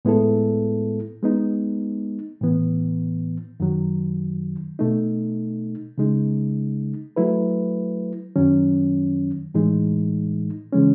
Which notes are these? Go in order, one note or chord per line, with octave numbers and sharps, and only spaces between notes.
A2 G#3 B3 E4 A4
G#3 B3 D#4
A2 E3 B3
F#2 D#3 F#3
B2 A3 D#4
C#3 G#3 D#4
F#3 A3 E4 B4
F#2 D#3 F#3 C#4
A2 E3 G#3 D#4
C#3 E3 G#3 C#4